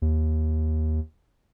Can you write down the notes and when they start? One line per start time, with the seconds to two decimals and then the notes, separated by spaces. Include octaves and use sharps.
0.02 D#2